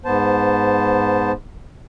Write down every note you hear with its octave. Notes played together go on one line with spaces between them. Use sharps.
G#2 B3 C5 A5